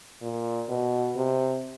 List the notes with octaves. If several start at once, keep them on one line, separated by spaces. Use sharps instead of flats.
A#2
B2
C3